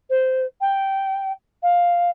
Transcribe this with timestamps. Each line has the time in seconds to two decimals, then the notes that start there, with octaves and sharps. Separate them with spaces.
0.10 C5
0.61 G5
1.62 F5